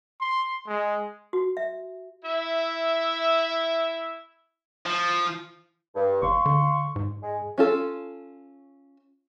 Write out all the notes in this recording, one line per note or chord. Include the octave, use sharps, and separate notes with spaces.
C6
G#3
F#4
E5
E4 E5
F3
G2
F#1 F5 C6 C#6
D3
G#2
G#3
C#4 F4 A4